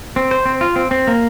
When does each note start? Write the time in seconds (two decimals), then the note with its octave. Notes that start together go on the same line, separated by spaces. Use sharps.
0.16 C4
0.31 C5
0.46 C4
0.61 F4
0.76 C4
0.91 C4
1.07 A#3